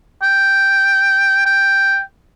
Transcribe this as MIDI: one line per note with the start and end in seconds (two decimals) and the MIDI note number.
0.23 1.43 79
1.46 2.01 79